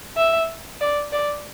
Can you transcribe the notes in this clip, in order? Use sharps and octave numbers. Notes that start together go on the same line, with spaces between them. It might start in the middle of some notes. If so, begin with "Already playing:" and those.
E5
D5
D5